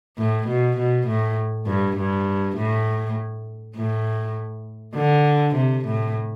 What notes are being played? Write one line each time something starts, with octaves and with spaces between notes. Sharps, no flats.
A2
B2
B2
A2
G2
G2
A2
A2
D3
C3
A2